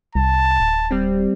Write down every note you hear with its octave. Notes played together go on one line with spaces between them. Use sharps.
C2 A5
D1
G3 C4